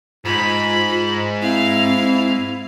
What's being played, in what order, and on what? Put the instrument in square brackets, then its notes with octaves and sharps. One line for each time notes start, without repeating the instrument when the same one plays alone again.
[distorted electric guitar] G#2 G#3 [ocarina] F4 [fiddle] B5
[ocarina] C4 [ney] E4 [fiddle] F5